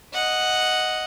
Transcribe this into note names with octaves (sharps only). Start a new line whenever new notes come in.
D#5 F#5